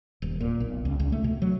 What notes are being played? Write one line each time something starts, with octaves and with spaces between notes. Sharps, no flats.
D#1
A#2
B1
C#2
C#2
A3
B2
F#3